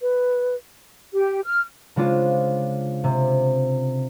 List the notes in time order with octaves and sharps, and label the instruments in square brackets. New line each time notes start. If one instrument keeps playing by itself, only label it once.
[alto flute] B4
[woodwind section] G4
F6
[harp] C#3 G#3 D4 F4 C5
C3